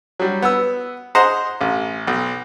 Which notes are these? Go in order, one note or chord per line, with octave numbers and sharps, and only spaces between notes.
F#3 G3
B3 E6
G#4 C5 D#5 F#5 A#5
A1
B1